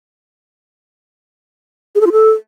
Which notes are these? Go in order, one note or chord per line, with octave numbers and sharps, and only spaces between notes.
G#4
A4
F4
A4